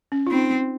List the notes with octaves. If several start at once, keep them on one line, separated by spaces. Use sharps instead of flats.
C#4
F4
C4 D#4